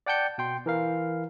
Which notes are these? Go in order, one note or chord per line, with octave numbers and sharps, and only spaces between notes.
D5 F#5 G5 A5 G6 C#7
B2 G5 C6
E3 A#4 F5